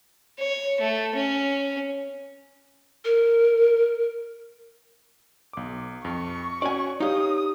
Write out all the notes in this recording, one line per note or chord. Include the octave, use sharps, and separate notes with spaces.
C#5
A3
C#4
A#4
B1 D6
F2 C#6
C#4 F#4 D5 G#5
D#4 G4 C#5 F5 A#5 D#6